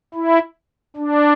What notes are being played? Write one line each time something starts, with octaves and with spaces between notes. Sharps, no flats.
E4
D4